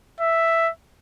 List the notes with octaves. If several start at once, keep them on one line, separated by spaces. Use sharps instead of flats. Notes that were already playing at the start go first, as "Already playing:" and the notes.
E5